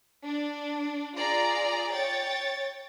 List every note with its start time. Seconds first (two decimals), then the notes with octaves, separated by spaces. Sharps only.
0.24 D4
1.17 F4 G#4 D5 A#5
1.92 C#5 G5 A6